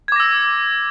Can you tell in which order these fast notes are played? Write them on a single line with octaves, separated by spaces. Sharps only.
G#6 D6 A#6 E6